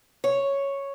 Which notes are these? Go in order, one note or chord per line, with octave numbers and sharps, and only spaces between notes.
C#5